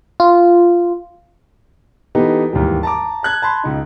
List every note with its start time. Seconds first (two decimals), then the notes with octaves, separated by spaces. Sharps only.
0.20 F4
2.15 E3 B3 D#4 G4 A4 B4
2.53 D#2 G#2 E3 G3
2.83 A5 A#5 D6
3.23 A5 F#6 G#6
3.42 A5 B5 C6
3.64 C#2 D#4